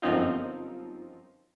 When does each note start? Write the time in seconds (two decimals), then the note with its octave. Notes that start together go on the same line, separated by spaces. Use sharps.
0.02 G1 F#2 F3 C4 D#4 F4